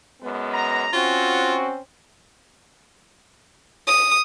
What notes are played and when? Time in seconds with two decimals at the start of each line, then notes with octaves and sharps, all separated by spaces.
0.22 F#2 G#3 B3
0.52 A#5
0.93 C4 C#4 F4 F#4
3.87 D#6